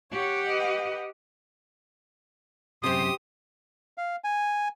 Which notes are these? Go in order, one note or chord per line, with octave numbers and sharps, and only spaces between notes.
G4 C#5 F#5
B4 D#5
F#2 C3 G4 C5 D#6
F5
G#5